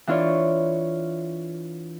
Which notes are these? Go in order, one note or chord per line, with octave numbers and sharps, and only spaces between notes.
E3 D4 F4 C#5 D5